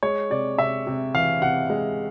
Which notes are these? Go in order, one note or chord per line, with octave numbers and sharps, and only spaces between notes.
G#3 C#5
C3 D5
C3 E5
C3
E3 F5
C3 F#5
G#3